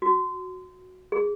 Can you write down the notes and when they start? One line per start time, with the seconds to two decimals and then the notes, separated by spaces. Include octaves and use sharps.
0.02 F#4
1.12 G#4